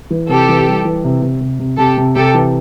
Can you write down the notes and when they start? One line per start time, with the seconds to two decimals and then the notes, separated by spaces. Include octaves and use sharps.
0.10 E3
0.29 C3 G4 A4
0.49 E3
0.67 G3
0.85 E3
1.04 C3
1.22 C3
1.41 C3
1.59 C3
1.78 C3 G4 A4
1.97 C3
2.15 C3 G4 A4
2.34 E3